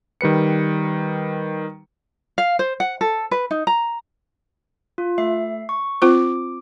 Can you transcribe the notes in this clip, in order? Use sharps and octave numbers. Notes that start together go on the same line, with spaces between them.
D#3 G3 B4 C#7
F5
C5
F#5
A4
B4
D#4
A#5
F4
A3 E5 C7
C#6
C4 F4 C5 D6